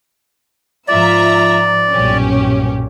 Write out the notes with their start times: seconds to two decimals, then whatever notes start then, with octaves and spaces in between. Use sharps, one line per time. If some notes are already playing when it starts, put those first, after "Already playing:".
0.88 G#2 F3 F4 D5 E5 A#5
1.90 B1 G2 A#2 C#4 G4